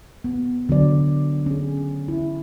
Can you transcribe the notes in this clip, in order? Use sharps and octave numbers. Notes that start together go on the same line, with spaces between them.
B3
D3 F#3 D5
C#4 G#4
E4